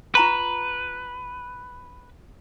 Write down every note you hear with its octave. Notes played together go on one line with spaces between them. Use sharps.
F4 B4 A#5 C#6